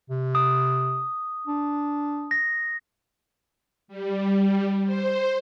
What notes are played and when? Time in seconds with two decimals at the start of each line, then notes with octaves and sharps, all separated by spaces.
0.10 C3
0.35 D#6
1.47 D4
2.31 A#6
3.88 G3
4.85 C5